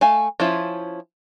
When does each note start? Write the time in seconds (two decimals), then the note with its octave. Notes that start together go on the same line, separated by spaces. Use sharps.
0.01 A3 F5 G#5
0.40 F3 C#4 E4 F4